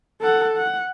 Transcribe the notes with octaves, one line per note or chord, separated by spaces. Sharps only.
A4 F#5
F#5